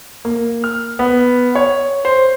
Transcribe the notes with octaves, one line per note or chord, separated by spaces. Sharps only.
A#3
F6
B3
C#5
C5